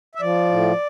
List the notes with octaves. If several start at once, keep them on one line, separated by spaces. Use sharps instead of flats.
E5
F3 D5
A2